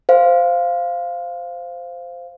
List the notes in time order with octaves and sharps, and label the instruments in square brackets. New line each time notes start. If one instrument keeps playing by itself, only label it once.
[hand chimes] C5 F5